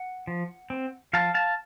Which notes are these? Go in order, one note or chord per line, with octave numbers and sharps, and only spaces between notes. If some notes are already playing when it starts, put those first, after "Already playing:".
Already playing: F#5
F3
C4
F3 F5 A5
F5 A5